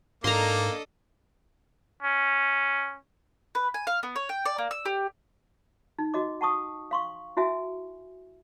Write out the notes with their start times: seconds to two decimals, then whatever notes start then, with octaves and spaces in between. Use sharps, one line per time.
0.24 G#2 A#3 D4 A4 D#5 A#5 C6
2.03 C#4
3.55 B4
3.74 G#5
3.87 F5
4.03 B3
4.16 C#5
4.29 G5
4.45 D5
4.58 A#3
4.71 E6
4.85 G4
5.99 D#4
6.14 F#4 D#5 D6
6.41 F#5 A5 C#6 D#6
6.91 F5 C6 C#6
7.37 E4 F#4 E5 G#5